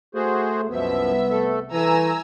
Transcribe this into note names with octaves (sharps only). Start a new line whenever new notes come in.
A3 F#4 G#4 C5
C2 F#2 B2 F3 B3 E5
A3 A4
E3 A3 G#5 A#5 E6